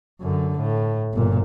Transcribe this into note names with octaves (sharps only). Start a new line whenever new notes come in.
F#2 D3
A2
G1 A#2